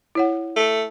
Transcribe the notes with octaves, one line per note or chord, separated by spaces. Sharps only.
E4 C#5 F#5
A3